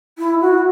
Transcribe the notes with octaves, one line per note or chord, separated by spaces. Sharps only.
E4
F#4